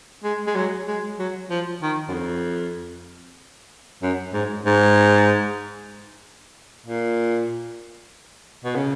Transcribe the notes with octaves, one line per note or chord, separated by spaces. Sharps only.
G#3
G#3
F#3
G#3
F#3
F3
D#3
F#2
F2
F#2
G#2
G#2
A#2
B2
C#3